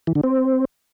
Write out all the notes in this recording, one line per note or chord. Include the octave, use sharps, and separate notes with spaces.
E3
D3
C4